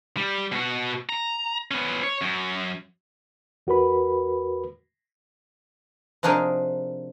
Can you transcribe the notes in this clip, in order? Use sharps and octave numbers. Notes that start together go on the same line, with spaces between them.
G3
B2 F#4
A#5
B3 C#4
C#5
F#2
E2 F#4 A#4 B4 B5
C3 F3 D4 D#4 G#4 A#4